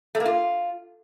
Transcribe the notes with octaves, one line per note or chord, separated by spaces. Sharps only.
A3
A#3
F4